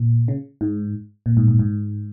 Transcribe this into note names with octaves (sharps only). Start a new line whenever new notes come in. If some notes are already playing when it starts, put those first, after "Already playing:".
Already playing: A#2
C#3
G#2
A#2
G#2
G#2
G#2